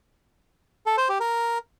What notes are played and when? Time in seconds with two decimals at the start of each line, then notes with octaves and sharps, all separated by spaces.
0.86 A4
0.98 C5
1.09 G4
1.20 A#4